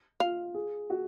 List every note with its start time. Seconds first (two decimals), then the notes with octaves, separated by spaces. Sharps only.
0.20 F4 F5
0.54 G#4
0.90 F#4